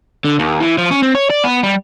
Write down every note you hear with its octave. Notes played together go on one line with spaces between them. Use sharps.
D3
D#2
E3
F3
C#4
C4
C#5
D5
B3
G3